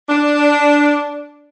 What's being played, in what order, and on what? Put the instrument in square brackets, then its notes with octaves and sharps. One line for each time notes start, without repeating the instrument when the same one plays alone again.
[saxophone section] D4